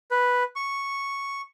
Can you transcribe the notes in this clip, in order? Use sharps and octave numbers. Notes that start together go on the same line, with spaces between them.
B4
C#6